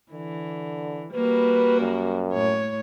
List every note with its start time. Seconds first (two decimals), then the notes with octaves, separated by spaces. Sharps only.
0.12 D3 E3
1.14 G3 A#3 F#4 B4
1.80 F#2
2.31 A2 C#5